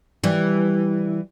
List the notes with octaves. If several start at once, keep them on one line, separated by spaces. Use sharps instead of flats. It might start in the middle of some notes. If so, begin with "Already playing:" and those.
E3 G3